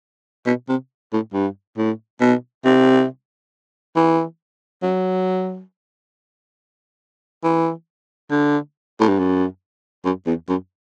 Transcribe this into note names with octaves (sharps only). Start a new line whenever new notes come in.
B2
C3
A2
G2
A2
B2
C3
E3
F#3
E3
D3
A2
G2
F#2
F#2
E2
F#2